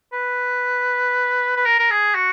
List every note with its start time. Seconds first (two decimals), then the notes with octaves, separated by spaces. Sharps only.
0.13 B4
1.57 B4
1.65 A#4
1.79 A#4
1.91 G#4
2.15 F#4